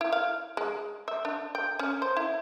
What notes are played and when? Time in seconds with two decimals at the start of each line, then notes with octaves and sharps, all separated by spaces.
0.01 E4
0.12 F5
0.57 G#3
1.08 E5
1.25 D4
1.55 G5
1.79 C#4
2.02 C5
2.17 E4